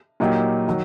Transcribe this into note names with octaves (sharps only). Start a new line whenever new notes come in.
A#2 F#3 A#3 D#4 G4
D#3 F#3